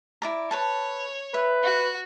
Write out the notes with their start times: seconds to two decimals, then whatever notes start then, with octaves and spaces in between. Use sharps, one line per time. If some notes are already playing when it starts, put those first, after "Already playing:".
0.22 E4 D5 A#5
0.51 A4 B4 C#5 A5
1.34 B4 E5
1.63 F#4